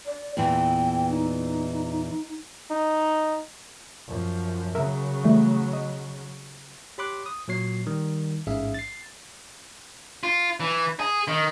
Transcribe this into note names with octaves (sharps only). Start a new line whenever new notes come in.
D5
E2 A#2 E3 G5
D#4
D#4
F#2 F3
C#3 F#3 A#4 E5 A#5
E3 G3 A3
D#5
G4 C#5 B5 C6 D6 F#6
D#6
A#2 F#3 C#5 C7
D#3 G3
A1 G#2 C#4 G#4 E5 F5
A6 C7
F4
E3
G#4
D#3